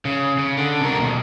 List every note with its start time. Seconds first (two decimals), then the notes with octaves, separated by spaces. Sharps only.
0.05 C#3
0.38 C#3
0.57 D3
0.81 C3 A#4
0.97 D#2 B2